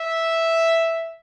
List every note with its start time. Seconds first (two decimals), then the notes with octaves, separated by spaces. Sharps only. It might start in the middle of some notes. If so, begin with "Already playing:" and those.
Already playing: E5